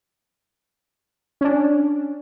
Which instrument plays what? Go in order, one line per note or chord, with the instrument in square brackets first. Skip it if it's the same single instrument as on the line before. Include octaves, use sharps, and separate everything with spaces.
[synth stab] C#4 D4